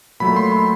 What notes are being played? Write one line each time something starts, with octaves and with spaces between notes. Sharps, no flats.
A#2 F#3 A3 B5
C6
C6